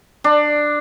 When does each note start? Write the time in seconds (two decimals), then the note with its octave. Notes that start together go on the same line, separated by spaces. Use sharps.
0.24 D4